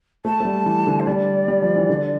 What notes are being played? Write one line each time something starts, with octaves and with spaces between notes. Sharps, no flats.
A3 A5
A3
G3
E3
D3
C5
G3 D5
G3
F3
E3
D3